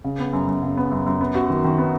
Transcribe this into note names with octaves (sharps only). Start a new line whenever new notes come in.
C#3
B3
F#2
F#2
C#3
B3
F#2
F#2
B3
F#4
D#3
D#3
B3